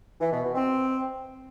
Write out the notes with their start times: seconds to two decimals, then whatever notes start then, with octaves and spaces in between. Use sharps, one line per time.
0.20 E3
0.32 B2
0.43 B2
0.54 C4